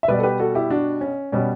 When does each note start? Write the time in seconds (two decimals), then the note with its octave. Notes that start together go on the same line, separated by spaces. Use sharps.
0.03 E5
0.08 B2 G3 B4 D5
0.19 A4
0.23 G4 B4
0.40 F#4 A4
0.55 E4 G4
0.70 D4 F#4
1.01 C#4
1.32 B2 G3 C#4